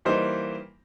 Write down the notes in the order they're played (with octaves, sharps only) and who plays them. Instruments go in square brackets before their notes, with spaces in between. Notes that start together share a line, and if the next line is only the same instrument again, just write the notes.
[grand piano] E3 G3 A#3 D#4 C5